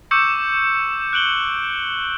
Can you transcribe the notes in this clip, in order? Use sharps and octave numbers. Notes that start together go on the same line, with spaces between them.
C#6 D6 E6 G6 C#7 E7
F#6 D7 F#7 G7